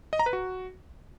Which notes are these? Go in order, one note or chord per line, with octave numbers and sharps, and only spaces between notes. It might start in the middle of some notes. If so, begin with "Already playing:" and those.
D#5
A#5
B4
F#4